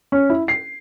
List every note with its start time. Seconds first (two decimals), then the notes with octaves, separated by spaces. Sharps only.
0.12 C#4
0.30 E4
0.48 C7